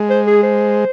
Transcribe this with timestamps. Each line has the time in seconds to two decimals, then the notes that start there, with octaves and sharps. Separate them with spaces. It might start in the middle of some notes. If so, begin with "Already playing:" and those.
Already playing: G#3
0.10 C5
0.27 G#4
0.43 C5